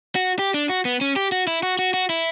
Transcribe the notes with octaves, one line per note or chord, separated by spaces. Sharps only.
F#4
G4
D4
F#4
B3
C#4
G4
F#4
E4
F#4
F#4
F#4
E4